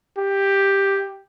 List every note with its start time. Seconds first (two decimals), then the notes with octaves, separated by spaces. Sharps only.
0.17 G4